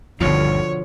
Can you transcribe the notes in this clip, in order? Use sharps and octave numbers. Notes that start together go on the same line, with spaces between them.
G1 D#2 B2 D3 F3 C#5